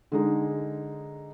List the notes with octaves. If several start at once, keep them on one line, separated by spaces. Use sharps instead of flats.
D3 G#3 D#4